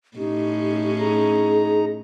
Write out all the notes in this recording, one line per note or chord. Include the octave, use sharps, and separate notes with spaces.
A2 C#4 D#4 G4
D#4 G#4 A#5